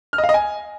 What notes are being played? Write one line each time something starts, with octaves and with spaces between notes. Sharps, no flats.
F6
D#5
F5
D#5
G#5